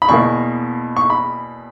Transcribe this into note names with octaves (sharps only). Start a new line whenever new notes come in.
B5
E2 B2 A#3 C#6
C#6
B5